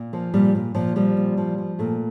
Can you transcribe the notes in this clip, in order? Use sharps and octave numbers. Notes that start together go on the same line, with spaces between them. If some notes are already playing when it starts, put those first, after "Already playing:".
Already playing: A#2
F3 A#3
A#2 G3
A#2
A#2 F3
F3 G3
A#2
F3
F3
A#2 A3